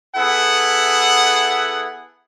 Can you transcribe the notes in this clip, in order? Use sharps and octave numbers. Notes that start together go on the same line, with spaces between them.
B3 E4 G#4 A4 F#5